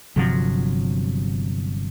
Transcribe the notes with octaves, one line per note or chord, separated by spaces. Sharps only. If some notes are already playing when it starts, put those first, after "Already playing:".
G1 C3 F3 F#3